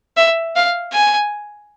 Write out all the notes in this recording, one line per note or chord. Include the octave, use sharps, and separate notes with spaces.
E5
F5
G#5